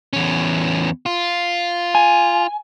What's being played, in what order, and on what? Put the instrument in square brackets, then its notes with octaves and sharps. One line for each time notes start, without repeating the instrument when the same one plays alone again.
[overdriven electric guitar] E2 C#4
F4
[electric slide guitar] G#5